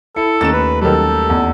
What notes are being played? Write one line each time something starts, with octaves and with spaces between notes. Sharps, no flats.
E4 A4 C#7
D#2 A3 C#4 A6 E7
B4
D#3 F#3 G3 A4
E2